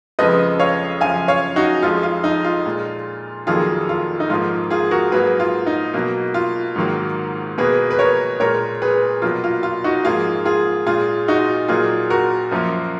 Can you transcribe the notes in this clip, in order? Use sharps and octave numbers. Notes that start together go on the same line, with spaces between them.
F2 C#3 F3 G#3 B4 D#5
C#5 F5
F#2 C#3 F3 F5 G#5
C#5 F5
D#4 F#4
F2 F3 G#3 F4
F4
D#4
F4
A#2 G#3
F2 D#3 F#3 A#3 F4 G#4
F4
D#4
G#2 F3 A#3 F4
F4 G#4
F#4 A#4
G#2 F#3 A#3 G#4 B4
F4
D#4
B2 F#3 A#3
F4
G#2 D#3 F#3 A#3
B2 A#3 G#4 B4
B4
A#4 C#5
A#2 G#3 A#4 C#5
G#4 B4
B2 F#3 A#3 F4
F4
F4
D#4 F#4
G#2 F3 A#3 F4 G#4
F4 G#4
A#2 G#3 F4 G#4
D#4 F#4
A#2 F#3 A#3 F4 G#4
F#4 A#4
F#2 F3 A#3